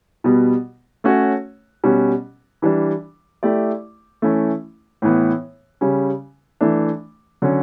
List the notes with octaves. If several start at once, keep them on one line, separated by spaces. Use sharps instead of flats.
B2 G3 B3
A3 C#4 F#4 C#5
B2 G3 C#4 F#4
E3 G3 D4
A3 E4 G4 D5
E3 A3 C#4 E4
A2 E3 B3
C#3 G3 C#4
E3 A3 D4
D3 F#3 C#4